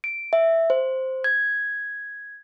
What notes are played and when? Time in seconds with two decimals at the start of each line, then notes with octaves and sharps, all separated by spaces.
0.04 D7
0.33 E5
0.70 C5
1.24 G#6